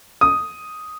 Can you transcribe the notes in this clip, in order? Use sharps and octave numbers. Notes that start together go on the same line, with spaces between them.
D#6